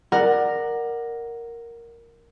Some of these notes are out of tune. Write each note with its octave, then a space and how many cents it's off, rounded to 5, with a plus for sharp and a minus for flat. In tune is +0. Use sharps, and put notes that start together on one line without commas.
A#4 +0 D5 +20 F#5 +0